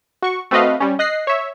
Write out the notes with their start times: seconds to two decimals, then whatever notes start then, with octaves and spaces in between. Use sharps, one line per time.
0.22 F#4 C#6
0.51 A3 C4 F#4 B4 D#5 F5
0.80 G3 C#4
0.99 D#5 F#6 A#6 C7
1.27 C#5 E5